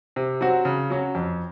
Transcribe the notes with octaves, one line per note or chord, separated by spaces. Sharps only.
C3
F#3 C4 F#4
C#3
F#3 C#4 F#4
F2